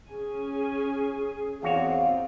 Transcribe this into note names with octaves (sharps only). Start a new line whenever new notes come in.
C#4 G#4 G#5
E2 C4 D#4 F#4 C#5 F5